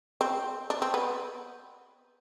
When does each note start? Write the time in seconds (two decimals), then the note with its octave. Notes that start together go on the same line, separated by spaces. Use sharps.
0.21 C4
0.70 D4
0.82 C4
0.94 B3